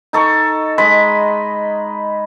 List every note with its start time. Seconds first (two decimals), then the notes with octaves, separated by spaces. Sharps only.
0.13 D#4 A4 C#6
0.78 G#3 D#5 B5